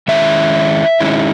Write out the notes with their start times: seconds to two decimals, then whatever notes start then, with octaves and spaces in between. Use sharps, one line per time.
0.08 D#3 G#3 C#4 E4 E5
1.00 D#3 G#3 C#4 E4